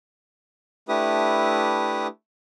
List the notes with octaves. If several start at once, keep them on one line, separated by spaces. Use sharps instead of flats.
A3 D4 E4 G4 B4 D#6